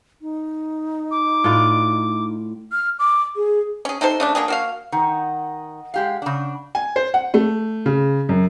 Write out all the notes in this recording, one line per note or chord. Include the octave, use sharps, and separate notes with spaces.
D#4
D6
A2 F4 D5
F6
D6
G#4
C#4 G#4
C3 D#4 A4 C5
C#3 A3 D4
F#3 A#3 D4 G#4
A#3 F#4 F5
D#3 D#5 F#5
G#3 G4 F5
C#3 D4
G#5
C5
F#5
A3
C#3
F#2